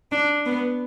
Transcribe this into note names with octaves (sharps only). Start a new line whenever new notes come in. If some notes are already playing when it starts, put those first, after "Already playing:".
D4
B3